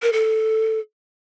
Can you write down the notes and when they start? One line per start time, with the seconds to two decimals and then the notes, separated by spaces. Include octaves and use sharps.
0.03 A#4
0.13 A4